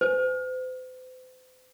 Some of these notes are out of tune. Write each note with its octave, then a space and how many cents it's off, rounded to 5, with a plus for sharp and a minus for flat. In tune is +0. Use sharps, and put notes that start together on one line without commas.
C5 -45